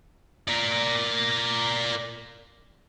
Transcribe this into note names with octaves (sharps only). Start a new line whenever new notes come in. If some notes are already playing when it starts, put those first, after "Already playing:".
A#4 D5